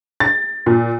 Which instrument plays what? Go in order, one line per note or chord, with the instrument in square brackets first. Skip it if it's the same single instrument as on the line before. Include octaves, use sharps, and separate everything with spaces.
[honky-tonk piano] A6
A#2